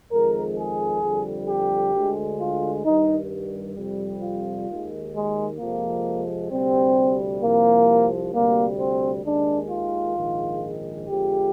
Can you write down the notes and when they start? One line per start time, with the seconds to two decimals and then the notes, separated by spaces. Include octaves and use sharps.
0.11 F2 D#3 G#3 A#4
0.57 G#4
1.03 F2 D3 G3
1.48 G4
1.94 D2 D3 G#3
2.39 F4
2.85 G2 D#3 G3 D#4
3.76 F2 C3 G3
4.22 F4
4.68 D#2 D#3 G#3
5.14 G#3
5.59 F2 C3 F3 G#3 A#3
6.51 D2 C3 G3 C4
7.42 C2 C3 F3 A#3
8.33 D2 C3 G3 A#3
8.78 C4
9.25 D#2 D#3 G#3 D4
9.70 F4
10.16 A#1 G#2 D#3 G#3
11.08 F2 D3 F3 G#3 G4